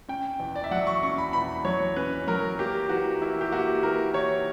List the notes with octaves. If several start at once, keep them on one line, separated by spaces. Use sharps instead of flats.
C#4 G5
E2
D5
E5
F#3 F#5
C#6
C#4 C#6
B5
E2 B5
F#3 C#5
C#4 B4
F#3 A#4
A#3 G4
E3 F#4
A#3 E4
G4
A#3 F#4
E3 A#4
E3 C#5